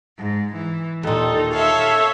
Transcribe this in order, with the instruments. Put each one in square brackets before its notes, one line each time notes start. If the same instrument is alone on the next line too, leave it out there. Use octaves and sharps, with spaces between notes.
[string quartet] G#2
E3
[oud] D#2 A#2 [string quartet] D#4 [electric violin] A4
[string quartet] A4 F5 A5 [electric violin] C#5 E5